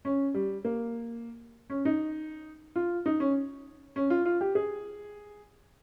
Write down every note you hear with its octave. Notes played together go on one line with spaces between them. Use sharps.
C#4
G3
A#3
C#4
D#4
F4
D#4
C#4
C#4
F4
F4
G4
G#4